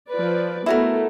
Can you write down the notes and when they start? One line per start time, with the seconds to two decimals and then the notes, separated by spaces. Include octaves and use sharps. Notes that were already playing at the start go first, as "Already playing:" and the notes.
0.10 F3 B4 D5
0.66 A3 B3 E4 F#4 A#4